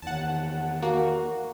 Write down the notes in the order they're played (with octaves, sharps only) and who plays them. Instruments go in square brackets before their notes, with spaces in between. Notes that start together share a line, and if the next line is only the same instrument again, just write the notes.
[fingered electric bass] E2 D#3 [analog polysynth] F#5 A5
[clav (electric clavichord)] A#3 [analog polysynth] F#4